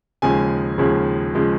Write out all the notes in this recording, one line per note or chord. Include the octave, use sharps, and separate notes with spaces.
D#2 C#3 F3 G#3 G#5
D#2 C#3 F3 G#3
C#3 F3 G#3